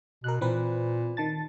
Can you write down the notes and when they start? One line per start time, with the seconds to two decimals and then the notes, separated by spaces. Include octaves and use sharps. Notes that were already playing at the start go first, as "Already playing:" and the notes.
0.24 B2 A#4 F#6
0.41 A#2 E3 C4 B4
1.17 D#3 A5 A6